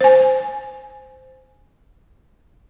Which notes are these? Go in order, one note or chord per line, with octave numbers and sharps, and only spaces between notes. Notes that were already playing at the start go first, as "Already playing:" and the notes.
C5 G#5